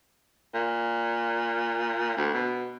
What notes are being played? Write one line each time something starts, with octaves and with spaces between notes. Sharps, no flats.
A#2
D2
B2